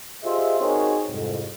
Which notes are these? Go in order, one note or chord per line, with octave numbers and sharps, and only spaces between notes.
F4 G4 G#4 C5 D#5 E5
C4 D#4 F#4 G#4 A#4 C#5
C2 F2 G#2